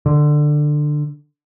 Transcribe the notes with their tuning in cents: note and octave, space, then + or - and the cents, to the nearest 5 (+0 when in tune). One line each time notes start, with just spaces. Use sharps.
D3 +15